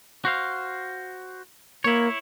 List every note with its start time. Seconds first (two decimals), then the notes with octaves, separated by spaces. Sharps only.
0.25 F#4 C5 F5
1.84 A#3 E4 C#5